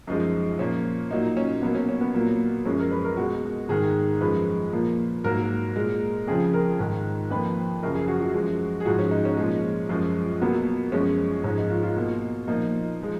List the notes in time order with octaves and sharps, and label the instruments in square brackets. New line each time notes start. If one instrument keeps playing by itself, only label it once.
[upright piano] F#2 F3 G#3 D#4
A#2 F3 A#3 C#4
A#2 F#3 A#3 D#4
C#4
B2 F#3 A#3 B3
C#4
C#4
B3
A#2 F#3 A#3
F#2 F3 G#3 C#4
A#4
B4
A#4
B2 G#3 F#4
G#2 D#3 G#3 G#4
F#2 F3 G#3 B4
A#2 F3 A#3
G#2 F#3 A#3 A#4
A#2 G#3
F2 C#3 F3 G#4
A#4
G#2 D#3 G#3
F2 F3 A#3 B4
F#2 C#3 F3 A#4
G#4
F#4
F#4
F#2 F3 G#3
G#4
G#2 F3 G#3 F#4
C#4
D#4
C#4
A#2 F3 G#3
F#2 F3 G#3
B2 F#3 A#3 B3
F#2 F3 G#3 C#4
G#2 F3 G#3 C#4
D#4
F4
F4
B2 A#3
A#2 F3 A#3 D#4
F3 G#3